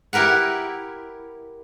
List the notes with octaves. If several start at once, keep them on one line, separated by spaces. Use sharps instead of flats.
E4 G4 A#4 B4 F#5